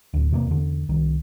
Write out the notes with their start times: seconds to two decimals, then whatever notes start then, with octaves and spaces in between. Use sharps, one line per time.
0.14 D1 D2
0.31 E2 C3 G#3 A#3
0.47 E2 D3
0.89 C2 D#3